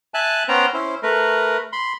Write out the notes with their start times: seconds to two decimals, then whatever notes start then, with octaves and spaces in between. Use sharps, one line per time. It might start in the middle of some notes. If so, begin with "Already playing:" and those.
0.14 E5 G#5 A5 F#6
0.48 B3 C#4 C5 G5 A#5
0.74 C#4 E4 C5
1.03 A3 A#4 B4
1.72 B5 C6